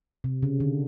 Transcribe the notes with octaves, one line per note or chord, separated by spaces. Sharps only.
C3
C#3
D3